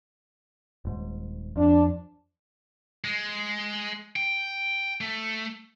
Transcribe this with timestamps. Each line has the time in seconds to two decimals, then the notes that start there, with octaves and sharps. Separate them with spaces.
0.85 D#1 G#2
1.56 F2 D4
3.04 G#3
4.16 G5
5.01 A3